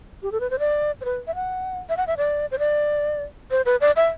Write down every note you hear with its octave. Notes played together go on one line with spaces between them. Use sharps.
G4
A4
B4
C5
D5
C5
B4
E5
F#5
E5
F#5
E5
D5
C5
D5
C5
B4
D5
E5